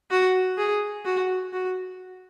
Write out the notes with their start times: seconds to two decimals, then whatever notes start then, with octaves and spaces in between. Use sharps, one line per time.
0.11 F#4
0.58 G#4
1.05 F#4
1.53 F#4